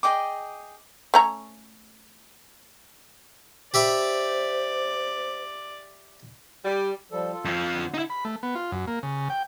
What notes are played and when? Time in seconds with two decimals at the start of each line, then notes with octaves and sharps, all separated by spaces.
0.03 G#4 D#5 G5 D6
1.14 A3 C#4 A#5
3.74 G4 C5 D5 E5 B5
6.65 G3
7.12 F3 G3 A4
7.33 F4 A4
7.45 F2 F3
7.72 D3
7.94 D#4 E4
8.10 B5
8.25 A3
8.43 B3
8.55 F4
8.72 F#2
8.87 A#3
9.03 C#3
9.30 G5